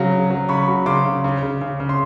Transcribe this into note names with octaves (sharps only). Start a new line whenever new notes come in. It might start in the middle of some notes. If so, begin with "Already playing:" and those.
Already playing: C#3 F#3
C#3
F#3
C#3 B5 C#6
F#3
C#3 C6 D6
C#3
C#3
C#3
C#3
C#3
C6